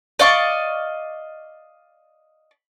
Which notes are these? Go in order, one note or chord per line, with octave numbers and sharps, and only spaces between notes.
D5 D#5 F5 C#6